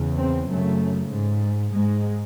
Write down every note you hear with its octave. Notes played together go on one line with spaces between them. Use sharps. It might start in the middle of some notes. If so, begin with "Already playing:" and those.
Already playing: E2 C#3
C4
F#2 C#3 A3
G#2
G#2 G#3